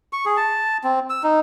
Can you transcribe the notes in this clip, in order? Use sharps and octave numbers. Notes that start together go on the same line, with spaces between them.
C#6
G#4
A5
C4
E6
D#4